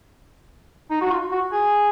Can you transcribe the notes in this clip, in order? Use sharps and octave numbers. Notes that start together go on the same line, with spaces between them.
D#4
F#4
F4
F#4
G#4